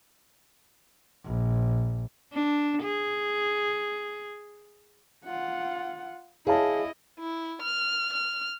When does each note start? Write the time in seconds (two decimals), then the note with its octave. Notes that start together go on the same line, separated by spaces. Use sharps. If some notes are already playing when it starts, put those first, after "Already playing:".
1.25 A#1
2.33 D4
2.82 G#4
5.24 F4 F#5
6.47 E4 G#4 C#5 D#5 F5 A5
7.20 E4
7.62 F6
8.13 F6